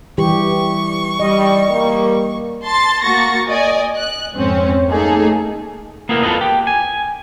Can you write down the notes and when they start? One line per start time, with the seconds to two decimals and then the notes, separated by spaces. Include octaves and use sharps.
0.18 E3 G3 G4 C#6
1.20 G3 D#5
1.70 G3 A#3
2.65 A5 C6 A6
3.03 A#3 F#4 C#6 A6 A#6
3.49 D5 D#5 G#5
3.98 F#6
4.33 F2 G#2 C4 C#4
4.87 A3 A#3 D#4 G#4 A4
6.09 A#3 B3 E4 A#4
6.23 F4 A4 B4 D#5
6.41 G4
6.67 G#5